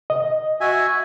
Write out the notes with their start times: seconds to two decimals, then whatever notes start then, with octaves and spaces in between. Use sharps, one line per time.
0.10 D#5
0.61 F#4 E5 G#5